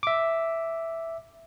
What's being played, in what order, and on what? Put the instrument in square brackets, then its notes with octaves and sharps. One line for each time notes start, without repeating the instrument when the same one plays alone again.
[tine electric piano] E5 D6